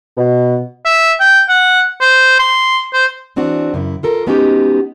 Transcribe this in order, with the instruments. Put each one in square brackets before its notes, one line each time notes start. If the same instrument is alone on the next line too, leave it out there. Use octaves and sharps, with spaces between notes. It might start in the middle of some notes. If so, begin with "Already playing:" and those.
[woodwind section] B2
[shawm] E5
G5
F#5
C5
C6
C5
[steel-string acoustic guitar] E3 C4 D4 F#4
F#2 C#3 E4
F4 A4 A#4
G#3 B3 C#4 D#4 F#4 G4